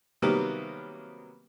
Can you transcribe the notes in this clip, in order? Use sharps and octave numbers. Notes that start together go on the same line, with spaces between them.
C3 D#3 F#3 G3 A#3 B3